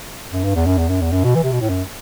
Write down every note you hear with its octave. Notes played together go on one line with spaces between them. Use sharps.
F#2
G2
E2
F#2
E2
F#2
E2
F#2
B2
E3
C3
B2
A2
F#2